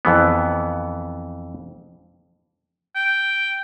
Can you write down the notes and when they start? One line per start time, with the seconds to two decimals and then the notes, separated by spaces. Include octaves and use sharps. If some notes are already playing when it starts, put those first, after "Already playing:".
0.05 F2 E3 B3
2.95 G5